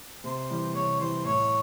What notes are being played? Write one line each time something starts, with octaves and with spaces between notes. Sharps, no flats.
C3 C5
E3 G3
C3 C#5
E3 G3 C5
A2 C#5